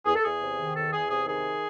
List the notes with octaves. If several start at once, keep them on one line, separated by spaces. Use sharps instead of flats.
E2 G#4
A4
E2 G#4
C3
D#3
E2 A4
E2 G#4
C3 G#4
D#3 G#4